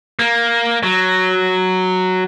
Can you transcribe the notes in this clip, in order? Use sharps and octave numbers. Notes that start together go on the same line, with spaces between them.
A#3
F#3